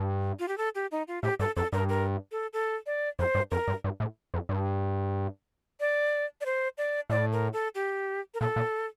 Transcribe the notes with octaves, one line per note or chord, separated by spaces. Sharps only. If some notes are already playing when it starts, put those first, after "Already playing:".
Already playing: G2
F4
G4
A4
G4
D#4
F4
A2 G4
G2 A4
F2 A4
G2 A#4
A#4
A4
A4
D5
F2 C5
G2
F2 A#4
G2
G2
A2
F2
G2
D5
D5
C5
D5
A2 D5
A#4
A4
G4
A#4
A#2 A4
A#2